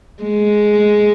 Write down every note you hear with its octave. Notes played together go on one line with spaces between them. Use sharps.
G#3